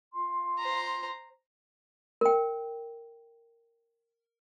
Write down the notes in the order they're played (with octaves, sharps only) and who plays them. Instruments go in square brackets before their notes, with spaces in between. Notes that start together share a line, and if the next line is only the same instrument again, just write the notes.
[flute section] F4 C6
[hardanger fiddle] C5 A#5
[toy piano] A#4 G5